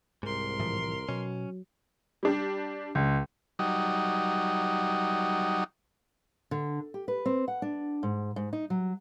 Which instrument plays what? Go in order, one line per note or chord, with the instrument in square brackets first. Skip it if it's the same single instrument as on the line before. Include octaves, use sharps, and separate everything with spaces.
[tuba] C2 [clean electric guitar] G#2 [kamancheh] A#4 C6
[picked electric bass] A2 E3 F3
[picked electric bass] B2 [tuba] F#3 [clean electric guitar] C#4
[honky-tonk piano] G3 D4 G4
[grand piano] C#2
[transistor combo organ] F#3 G3 D#4
[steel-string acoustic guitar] D3
G4
B4
C4
F#5
D4
G#2
G#2
D#4
F#3